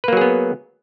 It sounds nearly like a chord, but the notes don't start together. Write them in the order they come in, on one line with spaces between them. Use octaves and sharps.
B4 A#3 F#3 G#4 B3